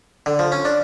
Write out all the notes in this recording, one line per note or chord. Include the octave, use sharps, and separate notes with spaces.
D3
F3
C#4
D4